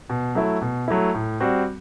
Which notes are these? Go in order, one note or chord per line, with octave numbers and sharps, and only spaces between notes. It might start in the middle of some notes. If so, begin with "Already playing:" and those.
B2
F#3 A3 E4
B2
F#3 A3 E4
A2
G3 C4 F#4